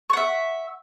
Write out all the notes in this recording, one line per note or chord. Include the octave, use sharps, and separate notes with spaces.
E5 F#5 C#6